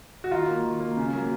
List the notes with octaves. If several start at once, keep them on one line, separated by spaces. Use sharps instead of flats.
F#4
D#3 F4
A#3
D#3
A#3
C#3
F#3 A#3